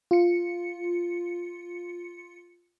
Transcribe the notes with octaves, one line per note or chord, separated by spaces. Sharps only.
F4 C#7